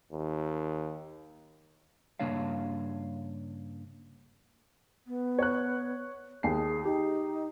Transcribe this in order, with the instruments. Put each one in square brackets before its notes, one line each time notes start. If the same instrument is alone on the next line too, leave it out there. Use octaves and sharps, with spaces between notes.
[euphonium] D#2
[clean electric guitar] G2 C#3 A#3 D4 C#5 F5
[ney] B3
[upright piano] C#5 F#6
[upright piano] D#2 C7 [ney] G#4
[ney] D#4 [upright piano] G4